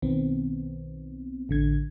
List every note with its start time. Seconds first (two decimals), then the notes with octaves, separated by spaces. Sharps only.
0.02 B1 D#3 B3 C4
1.49 A1 D3 G#6